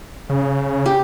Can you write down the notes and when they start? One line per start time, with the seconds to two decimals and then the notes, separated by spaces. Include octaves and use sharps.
0.29 C#3
0.86 G4